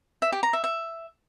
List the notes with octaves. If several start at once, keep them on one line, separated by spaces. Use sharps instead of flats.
E5
G4
A#5
E5
E5